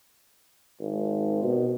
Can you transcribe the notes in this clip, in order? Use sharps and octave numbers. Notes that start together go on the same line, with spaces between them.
G#1
B2